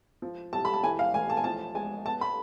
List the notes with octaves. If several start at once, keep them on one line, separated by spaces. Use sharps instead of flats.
F3
C2 A5
B5
A5
E3 G#5
F5
A1 G#5
A5
G#5
F3 A5
G#3 G#5
B3 A5
B5